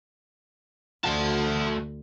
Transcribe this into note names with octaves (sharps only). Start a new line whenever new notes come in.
D2 A3 F#4 C5 A5